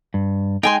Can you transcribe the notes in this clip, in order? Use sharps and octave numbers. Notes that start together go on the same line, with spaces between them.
G2
G#3 D#4 G5 G#5 C6